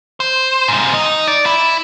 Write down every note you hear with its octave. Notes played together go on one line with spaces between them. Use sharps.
C5
G#2 C3
D#4
D5
E4